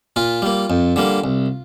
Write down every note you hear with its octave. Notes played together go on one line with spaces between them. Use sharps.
A#2 F4
G3 A#3
F2
D3 G3 A#3
C2